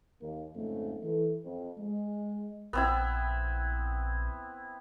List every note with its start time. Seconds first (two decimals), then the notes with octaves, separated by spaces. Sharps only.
0.21 D#2 A#3
0.55 F2 G#2 C#3 A3
1.04 E3 A4
1.45 F2
1.79 G#3
2.73 A#1 B3 C4 E4